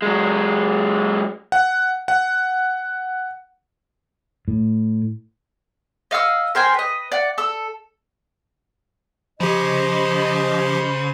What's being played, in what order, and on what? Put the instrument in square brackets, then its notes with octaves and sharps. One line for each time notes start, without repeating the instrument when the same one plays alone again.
[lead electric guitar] F#3 G#3
[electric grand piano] F#5
F#5
[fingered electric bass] A2
[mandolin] D#5 F5 F#5 E6
A#4 C5 G5 G#5
B4 D#5
D5 F#5
A4 E6
[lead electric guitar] C#3 [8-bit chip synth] F3 G4 [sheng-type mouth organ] C5 [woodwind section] D#5